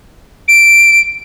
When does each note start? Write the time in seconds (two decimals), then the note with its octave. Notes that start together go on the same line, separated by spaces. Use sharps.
0.48 D7